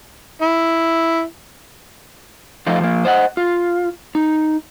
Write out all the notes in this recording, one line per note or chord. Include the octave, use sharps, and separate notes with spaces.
E4
F2 F3 A3 D#4 F4
F3 A#3
C5 D#5 F5 F#5
F4
D#4